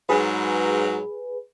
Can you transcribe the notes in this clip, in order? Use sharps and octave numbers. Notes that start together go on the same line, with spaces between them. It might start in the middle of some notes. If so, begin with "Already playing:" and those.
G#2 F#3 G#4 B4